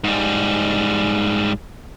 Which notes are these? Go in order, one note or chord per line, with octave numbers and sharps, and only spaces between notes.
G#2 G3